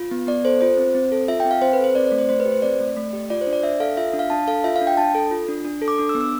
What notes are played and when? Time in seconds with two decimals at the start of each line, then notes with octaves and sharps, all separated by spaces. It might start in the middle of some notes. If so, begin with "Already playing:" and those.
Already playing: F4
0.11 B3
0.27 B3 D5
0.45 A4 C5
0.61 F4 C5
0.77 C4
0.95 C4
1.12 A4
1.28 F4 E5
1.40 G5
1.45 C4
1.51 F5
1.61 C4 C5
1.73 B4
1.79 A4 C5
1.95 C4 D5
2.07 D5
2.12 A3
2.18 C5
2.29 A3 C5
2.40 B4
2.45 G4
2.52 C5
2.62 C4 D5
2.80 A3
2.97 A3
3.13 G4
3.30 F4 D5
3.41 C5
3.47 D4
3.53 D5
3.63 D4 E5
3.80 A4 F5
3.97 F4 E5
4.13 D4
4.19 F5
4.30 D4 A5
4.47 A4 F5
4.64 F4 E5
4.76 F5
4.82 D4
4.87 G5
4.97 D4 A5
5.15 A4
5.31 F4
5.48 D4
5.65 D4
5.82 A4
5.88 D6
5.98 D4 D6
6.09 E6
6.15 B3
6.21 E6